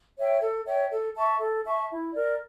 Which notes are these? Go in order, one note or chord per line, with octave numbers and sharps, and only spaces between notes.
C#5 E5 G5
A4
C#5 E5 G5
A4
E5 A5 C#6
A4
E5 A5 C#6
E4
A#4 D5